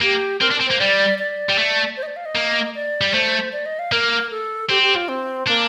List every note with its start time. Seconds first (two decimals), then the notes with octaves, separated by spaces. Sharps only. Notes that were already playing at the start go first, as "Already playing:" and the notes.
0.02 A#3 G4
0.41 C4 A#4
0.51 D4
0.60 C4
0.67 A#3 C5
0.80 G3 D5
1.19 D5
1.49 G3
1.58 A3
1.97 C5
2.03 D#5
2.07 D5
2.16 F5
2.25 D#5
2.36 A#3
2.75 D5
3.01 G3
3.14 A3 C5
3.52 D5
3.66 D#5
3.79 F5
3.92 A#3 A#4
4.31 A4
4.70 C4 G4
4.83 G4
4.95 F4
5.09 C4
5.47 A#3 D4